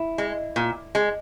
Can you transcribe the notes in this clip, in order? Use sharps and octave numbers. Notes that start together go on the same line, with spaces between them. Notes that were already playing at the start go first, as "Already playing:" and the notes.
Already playing: E4
G#3
A#2
G#3